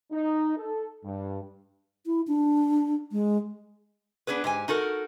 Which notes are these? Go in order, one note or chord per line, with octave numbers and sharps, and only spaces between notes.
D#4
A4
G2
E4
D4
G#3
B3 D4 G#4 B4
G#2 G4 G#5
D#4 F#4 A4 A#4